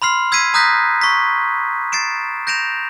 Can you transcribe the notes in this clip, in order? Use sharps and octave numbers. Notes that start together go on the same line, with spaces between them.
B5 C6 F6 C7
E6 G#6 B6 C7 D#7
A#5 D#6 F#6 G6 A#6 B6
C#6 B6
A6 C7 D7 E7
G6 A#6 D7 E7 F7